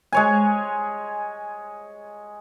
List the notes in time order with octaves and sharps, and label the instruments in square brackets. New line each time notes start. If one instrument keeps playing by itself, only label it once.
[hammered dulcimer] G#3 C#5 G#5